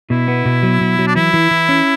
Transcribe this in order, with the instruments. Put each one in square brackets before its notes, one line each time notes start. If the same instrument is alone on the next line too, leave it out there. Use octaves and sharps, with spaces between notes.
[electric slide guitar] B2 [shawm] E4
[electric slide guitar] B3
B2
F#3
B2
F#3
[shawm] D4
[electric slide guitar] E3 [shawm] E4
[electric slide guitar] E3
E3
C#4